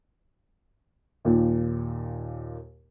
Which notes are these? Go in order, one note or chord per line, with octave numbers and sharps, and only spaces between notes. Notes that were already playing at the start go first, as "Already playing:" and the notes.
D#2 A#2